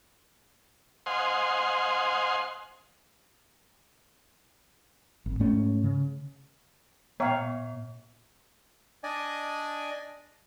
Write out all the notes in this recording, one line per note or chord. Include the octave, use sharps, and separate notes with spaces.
C5 D#5 F5 F#5 G#5 C6
G#1
G#2 A3 C#4
C#3
A#2 B3 C#5 F5 G5 A#5
D4 D5 D#5 G#5